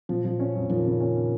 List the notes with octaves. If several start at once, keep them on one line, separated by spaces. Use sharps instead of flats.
A#2 F3
F3
C#4
F2
A#2 D#3 F3
C#3
C#4